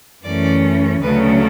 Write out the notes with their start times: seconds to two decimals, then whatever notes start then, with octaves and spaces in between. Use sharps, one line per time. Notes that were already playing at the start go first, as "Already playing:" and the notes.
0.24 F#2 E3 A3 C#4 D5
1.02 D2 C#3 F#3 A3 C#4 B4